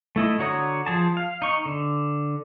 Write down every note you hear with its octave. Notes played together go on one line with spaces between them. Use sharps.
A3 E4 D#5
D3 F#4 C#5 A#5 D#6
F3 G#4 A5
F5
D#4 C#6
D3